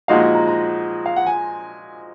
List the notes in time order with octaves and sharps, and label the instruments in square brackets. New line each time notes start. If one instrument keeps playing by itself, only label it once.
[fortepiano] A#2 F3 G#3 D#4 F#4 [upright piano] F5
[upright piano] F#5
A#5
A#5
F5
F#5
G#5